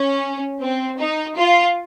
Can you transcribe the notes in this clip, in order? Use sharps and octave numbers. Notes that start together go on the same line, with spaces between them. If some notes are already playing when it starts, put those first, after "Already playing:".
Already playing: C#4
C4
D#4
F4